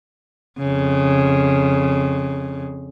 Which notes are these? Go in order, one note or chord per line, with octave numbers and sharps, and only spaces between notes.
F2 C#3